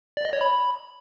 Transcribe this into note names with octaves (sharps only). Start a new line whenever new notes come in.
D5
D#5
C#5
B5